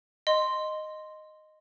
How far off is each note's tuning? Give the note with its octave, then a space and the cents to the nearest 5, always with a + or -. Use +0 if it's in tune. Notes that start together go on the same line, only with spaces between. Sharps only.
D#5 -5 C6 +0